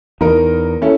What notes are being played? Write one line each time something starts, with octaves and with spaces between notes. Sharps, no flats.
E2 D#4 A#4
C#4 E4 A4